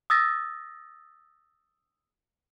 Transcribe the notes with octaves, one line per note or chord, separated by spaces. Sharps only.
D#6 E6 A6 A#6